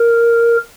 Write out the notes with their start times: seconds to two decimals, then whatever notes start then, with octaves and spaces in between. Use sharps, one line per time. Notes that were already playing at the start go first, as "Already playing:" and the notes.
Already playing: A#4